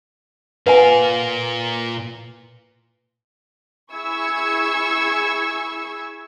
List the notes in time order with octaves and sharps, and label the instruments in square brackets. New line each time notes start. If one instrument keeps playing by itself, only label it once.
[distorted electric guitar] A#2 F5 [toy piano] B4 F#5 G#5
[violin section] E4 G#4 C#6 E6 G#6 C#7